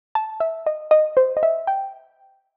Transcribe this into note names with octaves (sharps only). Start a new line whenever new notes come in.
A5
E5
D#5
D#5
C5
D#5
E5
G5